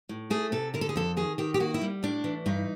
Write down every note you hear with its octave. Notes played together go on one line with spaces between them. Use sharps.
A2
A3 G#4
C3 A4
D3 A#4
A4
G#4
F2 A4
D#3 G#4
D#3 G4
G4
A#3 F#4
E4
G3
A2 D4
E3
G2 D#4